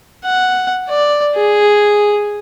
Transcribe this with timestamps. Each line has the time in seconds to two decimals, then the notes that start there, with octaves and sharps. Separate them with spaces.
0.25 F#5
0.89 D5
1.35 G#4